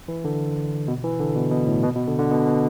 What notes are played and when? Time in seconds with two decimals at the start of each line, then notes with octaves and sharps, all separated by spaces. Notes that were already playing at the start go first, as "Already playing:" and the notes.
0.08 E3
0.24 D3
0.88 B2
1.04 E3
1.20 D3
1.36 B2
1.51 B2
1.67 A2
1.83 B2
1.95 B2
2.07 D3
2.19 D3
2.31 B2
2.47 B2